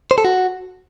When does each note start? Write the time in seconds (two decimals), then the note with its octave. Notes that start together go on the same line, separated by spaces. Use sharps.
0.11 C5
0.18 A4
0.25 F#4